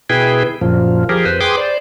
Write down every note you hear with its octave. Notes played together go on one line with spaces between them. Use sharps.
B2 E4 G#4 B4 G5
F#2 A#2 F3
F3 G4 G#4 A#4
F2 B4 C5
G#4 B4 G5 C6 D6 D#6
C5 D5